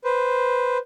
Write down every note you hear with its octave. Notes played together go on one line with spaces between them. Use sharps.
B4 C5